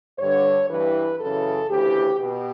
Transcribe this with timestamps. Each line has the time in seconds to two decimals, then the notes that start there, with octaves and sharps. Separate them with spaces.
0.19 G2 D3 C#5
0.69 G2 E3 B4
1.20 F#2 C#3 E3 A4
1.70 D2 C#3 E3 G4
2.20 B2 G4